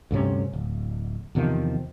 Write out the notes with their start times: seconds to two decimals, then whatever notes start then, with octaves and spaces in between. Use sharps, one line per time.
0.11 D2 G2 C3 C#4
0.53 D1
1.35 E2 C3 D#3 F3